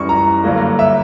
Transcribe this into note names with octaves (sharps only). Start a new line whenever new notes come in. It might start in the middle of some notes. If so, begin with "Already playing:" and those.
Already playing: F#2 E3 G3 C#6
A#5
G2 D3 F#3 A#3
E5